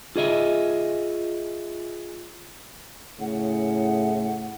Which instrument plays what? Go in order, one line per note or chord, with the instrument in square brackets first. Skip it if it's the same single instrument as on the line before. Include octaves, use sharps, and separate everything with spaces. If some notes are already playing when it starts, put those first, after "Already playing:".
[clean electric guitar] F4 G#4 D#5 E5
[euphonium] A2 [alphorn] C#3 [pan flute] F#5